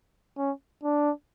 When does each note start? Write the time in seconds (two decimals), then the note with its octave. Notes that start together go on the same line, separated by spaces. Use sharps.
0.37 C#4
0.83 D4